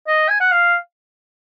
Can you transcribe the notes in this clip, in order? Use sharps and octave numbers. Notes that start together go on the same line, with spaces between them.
D#5
G#5
F#5
F5